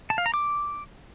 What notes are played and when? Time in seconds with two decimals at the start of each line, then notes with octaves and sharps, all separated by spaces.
0.10 A5
0.18 F5
0.26 A#5
0.34 D6